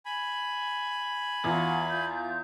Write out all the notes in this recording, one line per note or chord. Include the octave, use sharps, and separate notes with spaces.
G#5 B5
E2 F4 F#4 F6
F4 G6